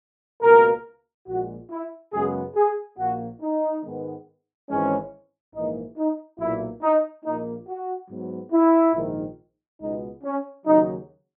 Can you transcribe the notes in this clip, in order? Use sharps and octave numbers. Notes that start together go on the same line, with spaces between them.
C#2 B2 A#3 A#4
A#1 A#2 G#3 F#4
E4
F#2 C#3 G#3 B3 G#4
G#4
A#1 A#2 A#3 F#4
D#4
G#2 D#3 G#3 B3
G#1 G#2 E3 G#3 C#4
A#1 G#2 E3 A#3 D#4
D#4
B1 A#2 A#3 E4
D#4
A#1 A#2 A#3 D#4
F#4
G#2 F#3 B3
E4
A#1 G#2 D#3
C#2 B2 G#3 B3 D#4
C#4
D#2 C#3 F#3 D#4